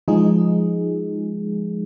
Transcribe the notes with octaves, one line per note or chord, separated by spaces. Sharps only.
F3 G#3 D#4 G#4